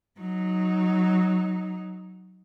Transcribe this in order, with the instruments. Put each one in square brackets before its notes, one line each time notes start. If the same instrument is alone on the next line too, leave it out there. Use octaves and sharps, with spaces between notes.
[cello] F#3 D#4